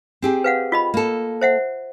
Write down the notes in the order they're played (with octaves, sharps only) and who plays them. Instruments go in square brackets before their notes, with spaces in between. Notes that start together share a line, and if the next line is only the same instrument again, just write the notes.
[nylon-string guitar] C4 G4 G#4
[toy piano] B4 F5 F#5
F4 D#5 B5
[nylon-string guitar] A#3 A4
[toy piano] C5 E5 F#5